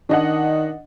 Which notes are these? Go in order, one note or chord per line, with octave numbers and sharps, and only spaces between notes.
D#3 D4 D#5 F#5